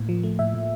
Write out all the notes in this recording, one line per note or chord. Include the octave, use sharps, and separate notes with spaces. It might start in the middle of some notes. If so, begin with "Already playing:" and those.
Already playing: A2 A#3
F3
A3
A2 E5
A2